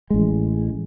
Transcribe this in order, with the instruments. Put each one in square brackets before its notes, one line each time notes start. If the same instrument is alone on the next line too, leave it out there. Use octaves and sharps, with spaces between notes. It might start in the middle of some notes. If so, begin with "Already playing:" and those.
[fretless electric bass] A1 G#3